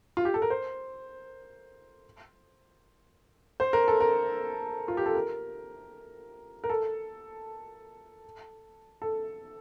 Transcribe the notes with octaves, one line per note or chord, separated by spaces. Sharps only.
F4
G4
A4
A#4
C5
C5
A#4
A4
A#4
F4
G4
A4
A#4
A#4
A4
A4